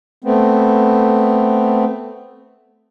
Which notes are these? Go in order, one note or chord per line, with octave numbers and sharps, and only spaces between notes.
A3 B3 C4